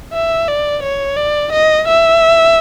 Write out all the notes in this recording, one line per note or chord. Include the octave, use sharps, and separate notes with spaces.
E5
D5
C#5
D5
D#5
E5